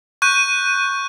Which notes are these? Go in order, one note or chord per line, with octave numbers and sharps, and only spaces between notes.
C#6 F#6 G6 D#7